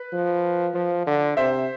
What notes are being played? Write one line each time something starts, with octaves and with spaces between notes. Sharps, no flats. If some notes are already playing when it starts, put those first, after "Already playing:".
Already playing: B4
F3
F3
D3
C3 C5 E5